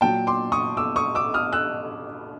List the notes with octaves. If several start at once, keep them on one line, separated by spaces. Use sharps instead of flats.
A#2 F#3 G5 A5
C6 D6
C#6 D#6
D6 E6
C#6 D#6
D6 E6
D#6 F6
E6 F#6